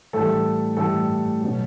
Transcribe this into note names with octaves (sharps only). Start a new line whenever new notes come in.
A2 E3 G3 A3 A4
A2 E3 G3 A3 A4
B2 F#3